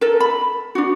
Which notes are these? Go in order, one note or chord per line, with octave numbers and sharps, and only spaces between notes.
A4 A#4
B5
D4 F#4